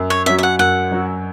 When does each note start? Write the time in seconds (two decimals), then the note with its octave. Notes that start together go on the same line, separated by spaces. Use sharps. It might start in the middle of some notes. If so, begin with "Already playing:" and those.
Already playing: F#2
0.10 C#5
0.26 F#3 C#4 F#4 E5
0.38 E5
0.43 F#5
0.59 F#2 F#5
0.91 F#3 C#4 F#4